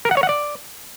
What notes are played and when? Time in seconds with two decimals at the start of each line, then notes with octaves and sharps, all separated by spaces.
0.05 A#4
0.11 F#5
0.17 C#5
0.23 F#5
0.29 D5